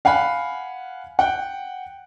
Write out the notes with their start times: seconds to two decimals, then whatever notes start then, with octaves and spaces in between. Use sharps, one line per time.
0.05 F5 F#5 G#5 B5
1.19 F#5 G5